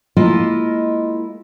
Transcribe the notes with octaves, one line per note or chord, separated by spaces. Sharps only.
G#3 A#3 E4 F4 D#5